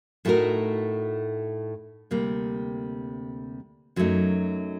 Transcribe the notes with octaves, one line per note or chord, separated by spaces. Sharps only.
A2 A3 D#4 F#4 A#4
D2 C3 G3 A#3
F#2 F#3 A3 D#4